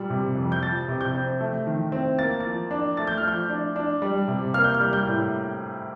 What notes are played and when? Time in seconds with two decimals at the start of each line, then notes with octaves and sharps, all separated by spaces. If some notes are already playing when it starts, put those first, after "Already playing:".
Already playing: A#2 G3
0.10 C3
0.36 F2
0.52 G6
0.62 F3 A6
0.88 C3
1.01 G6
1.15 C4
1.41 A3
1.67 D#3
1.92 C4
2.19 A#3 A6
2.40 F3 A6
2.71 D4
2.97 A3 A6
3.07 G6
3.18 F6
3.24 F3 G6
3.49 D4
3.76 D4
4.02 G3
4.28 C3
4.54 A#3 F6
4.64 G6
4.75 F6
4.80 G3
4.93 G6
5.07 A2